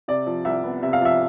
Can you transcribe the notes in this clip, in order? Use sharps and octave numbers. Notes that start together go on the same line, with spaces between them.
C3 D5
F3
C2 E5
B3
C3 E5
F5
F3 E5